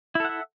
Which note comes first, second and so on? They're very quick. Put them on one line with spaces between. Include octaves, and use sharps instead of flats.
E4 A4 F#5 E5